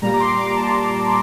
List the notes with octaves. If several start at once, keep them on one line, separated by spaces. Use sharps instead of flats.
A#2 G3 A#5
D6
C6
D6
A5